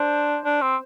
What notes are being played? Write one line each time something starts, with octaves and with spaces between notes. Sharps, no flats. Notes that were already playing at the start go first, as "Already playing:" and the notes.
Already playing: D4 C5
D4
C4